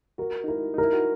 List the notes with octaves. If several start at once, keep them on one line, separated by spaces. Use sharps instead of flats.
F#4 A#4
D#4
E4 A#4
D#4 A#4
E4
F#4